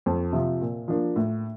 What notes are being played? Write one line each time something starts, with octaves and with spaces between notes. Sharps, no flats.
F2
C3 F3
A#2
F3 A#3 D4
A2